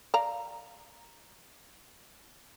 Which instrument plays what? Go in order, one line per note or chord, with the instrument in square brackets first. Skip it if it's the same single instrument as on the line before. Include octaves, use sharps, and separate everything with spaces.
[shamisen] D5 F5 A#5